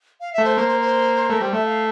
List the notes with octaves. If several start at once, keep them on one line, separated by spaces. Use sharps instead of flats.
F5
E5
A3
C5
A#3 C5
C5
C5
A3 A#4
G3 C5
A3 E5
F5